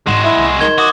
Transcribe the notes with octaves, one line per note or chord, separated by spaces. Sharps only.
G#2 G#3 A#3 F#4 C6 E7
E4
C2
D#3 D#4 G#6 G7
F#4 D6 D#6